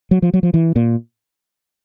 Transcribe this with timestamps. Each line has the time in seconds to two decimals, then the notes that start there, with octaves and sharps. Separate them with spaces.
0.11 F#3
0.22 F3
0.34 F#3
0.43 F3
0.54 E3
0.76 A#2